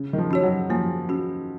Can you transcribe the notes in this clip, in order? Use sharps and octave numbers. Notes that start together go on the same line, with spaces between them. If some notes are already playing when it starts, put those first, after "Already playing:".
Already playing: C#3
D#3
F3
C#4 F#4 C#5
F#3
F3 A#3
C#4 F#4